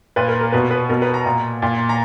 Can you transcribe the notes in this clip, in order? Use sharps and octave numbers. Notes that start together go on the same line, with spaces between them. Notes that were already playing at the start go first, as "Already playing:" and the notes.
A#2 B4
A#4
A#4
B2 B4
B4
B2 A#4
B4
A#5
A#2
A#2
A#5